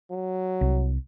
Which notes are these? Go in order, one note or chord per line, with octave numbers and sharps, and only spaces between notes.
F#3
C2